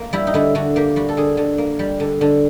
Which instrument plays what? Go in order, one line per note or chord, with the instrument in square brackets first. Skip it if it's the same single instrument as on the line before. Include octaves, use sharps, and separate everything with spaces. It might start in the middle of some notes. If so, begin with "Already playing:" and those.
Already playing: [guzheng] A#3
G3 E4
D#4
D3 E4
D3 F#4
A#3 G4
G3 F#4
A4
D3 G#4
D3
A#3
G3
D3
D3